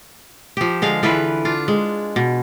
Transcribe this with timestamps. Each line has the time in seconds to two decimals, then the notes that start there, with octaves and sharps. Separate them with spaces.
0.57 F3 G4
0.82 D3 G#3 F5
1.03 D3 E3 F4 B4
1.45 D4 F4
1.68 G#3
2.16 B2